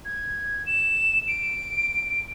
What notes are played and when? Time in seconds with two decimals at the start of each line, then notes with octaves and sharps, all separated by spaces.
0.05 G#6
0.66 E7
1.28 D7